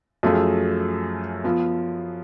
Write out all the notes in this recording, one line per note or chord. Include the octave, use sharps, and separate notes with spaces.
F#2 F3 A3 F4 G#4
F3 B3 F4